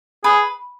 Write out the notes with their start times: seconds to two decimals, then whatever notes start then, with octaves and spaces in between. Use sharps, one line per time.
0.24 G#4 B4